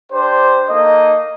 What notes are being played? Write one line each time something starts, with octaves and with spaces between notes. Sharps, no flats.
D4 G4 C5
A#3 D#4 A4 D#5